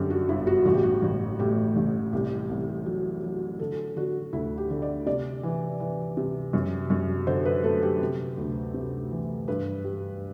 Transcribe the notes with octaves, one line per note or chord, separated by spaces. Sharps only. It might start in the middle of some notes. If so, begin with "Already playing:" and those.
Already playing: F#2 D3 G4
F#4
G1 E4
F#4
A1 F#4
G4
F#4
A1
A2 G4
A1
C2 G4
C2
F#3
F#3
D3 A4
D3 F#4
D2 E4
G4
D3
D5
C3 D5
E3
E3
C3
F#2
F#2
D3 C5
B4
A3 A4
G4
C3
D2
C3
E3
G2 B4
G3